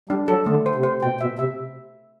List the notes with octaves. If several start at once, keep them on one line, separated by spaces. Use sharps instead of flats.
G3 D4
F#3 A4
D3 A3
C5
C3
C5
B2 G5
B2 E5
C3 E5